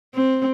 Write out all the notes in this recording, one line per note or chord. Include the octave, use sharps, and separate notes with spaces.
C4